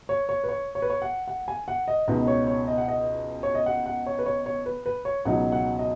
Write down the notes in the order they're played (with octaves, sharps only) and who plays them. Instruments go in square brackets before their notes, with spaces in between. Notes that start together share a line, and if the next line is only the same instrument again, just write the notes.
[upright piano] C#5
C#5
B4
C#5
C#5
B4
C#5
F#5
F#5
G#5
F#5
D#5
C#2 B2 B3 D#4 D#5
C#5
C#5
D#5
F#5
D#5
C#5
D#5
F#5
F#5
C#5
B4
C#5
C#5
B4
B4
C#5
C#2 B2 F#3 D#4 F#5
F#5
D#5